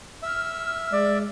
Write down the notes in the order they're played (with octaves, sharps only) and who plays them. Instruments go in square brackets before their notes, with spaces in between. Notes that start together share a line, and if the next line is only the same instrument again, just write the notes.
[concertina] E5 [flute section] F6
[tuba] G#3 [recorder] D5